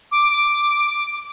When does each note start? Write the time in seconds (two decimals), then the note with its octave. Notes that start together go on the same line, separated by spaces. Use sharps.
0.11 D6
0.31 D6